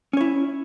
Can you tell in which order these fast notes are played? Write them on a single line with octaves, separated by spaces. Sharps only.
C#4 C#5 E4